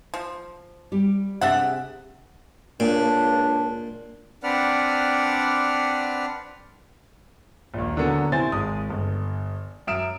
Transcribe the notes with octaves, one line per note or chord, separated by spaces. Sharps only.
F3
G3 G4
C3 D4 G4 G#4 E5 F#5
C#2 A#2 D4
C4 D4 B4 D5 F#5 F6
A#1 D#2
D3 F#3 A#3 B3 C#4
C3 E4 C5 G#5 A6
G#1 G#3 D#6
G1
F#2 E5 D#6 F6 D7 E7